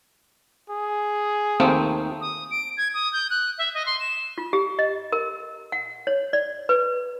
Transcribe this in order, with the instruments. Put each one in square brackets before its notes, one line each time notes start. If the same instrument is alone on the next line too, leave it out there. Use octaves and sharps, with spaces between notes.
[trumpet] G#4
[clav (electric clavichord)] D#2 A3 A#3 [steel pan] C4
[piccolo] D#6
D7
G#6
D#6
G6
F#6
E5
D#5
C6
E7
[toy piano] F4
G4
D#5
A#4
F#5
C#5
D5
B4